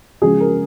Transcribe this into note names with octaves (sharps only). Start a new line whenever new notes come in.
C#3 F3 G#3 G#4
A#4